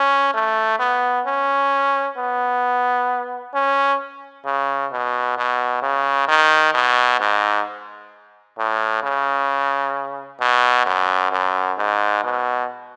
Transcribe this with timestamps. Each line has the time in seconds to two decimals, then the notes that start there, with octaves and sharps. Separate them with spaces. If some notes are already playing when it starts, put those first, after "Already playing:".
Already playing: C#4
0.34 A3
0.79 B3
1.26 C#4
2.17 B3
3.54 C#4
4.45 C#3
4.92 B2
5.37 B2
5.82 C#3
6.28 D#3
6.74 B2
7.20 G#2
8.58 A2
9.03 C#3
10.40 B2
10.86 F#2
11.31 F#2
11.78 G#2
12.24 B2